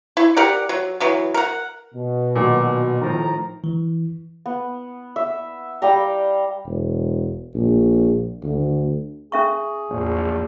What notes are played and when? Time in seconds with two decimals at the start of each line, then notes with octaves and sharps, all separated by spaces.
0.17 E4
0.37 G4 A#4 D5 F#5
0.69 F#3
1.00 E3 F#3 B3
1.34 A#4 F#5
1.95 B2
2.36 A#2 D#3 F#3
3.02 A2 D#3 F3 A#5
3.64 E3
4.46 B3
5.16 E5
5.82 G3 F5 G5 A#5
6.66 E1
7.55 A#1
8.44 D2
9.32 C#4 G#4 E5 C#6
9.90 A#1 E2 A2 C3